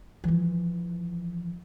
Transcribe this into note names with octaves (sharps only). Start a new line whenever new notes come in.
E3 F3